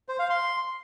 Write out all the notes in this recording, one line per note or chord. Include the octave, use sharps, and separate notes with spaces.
C5
F5
C6